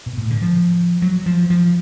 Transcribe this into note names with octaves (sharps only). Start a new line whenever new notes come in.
B2
A2
D3
F3
F#3
F3
F3